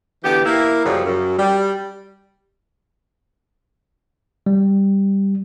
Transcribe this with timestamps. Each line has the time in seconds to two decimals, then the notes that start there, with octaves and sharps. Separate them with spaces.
0.24 D3 E3 B3 G4
0.45 A#3 E4
0.85 F#2 C#3 F3 G3
1.05 F#2
1.39 G3
4.46 G3